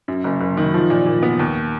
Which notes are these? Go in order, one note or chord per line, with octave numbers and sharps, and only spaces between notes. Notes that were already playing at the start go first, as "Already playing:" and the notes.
F#2
F#1
F#1
D#3
F3
A#2
A#2
B3
D#2